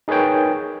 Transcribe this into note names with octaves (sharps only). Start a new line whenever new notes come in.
D#4 G#4 A#4 B4 C#5 G5